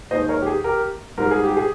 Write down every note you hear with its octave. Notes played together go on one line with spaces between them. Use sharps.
D#2 D#3 G#3 C5 D#5
A#4 C#5
G4
G#4
G4 A#4
G#2 G3 A#4
G#4
G4
G#4